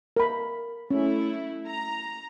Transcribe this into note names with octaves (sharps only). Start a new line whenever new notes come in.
A#4 B5
A3 C#4 E4
A#5